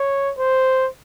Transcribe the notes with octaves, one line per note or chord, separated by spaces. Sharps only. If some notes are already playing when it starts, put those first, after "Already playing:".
Already playing: C#5
C5